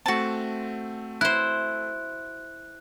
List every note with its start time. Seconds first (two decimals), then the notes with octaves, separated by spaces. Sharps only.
0.06 A3 C4 F#4 A5
1.21 E4 C5 F#6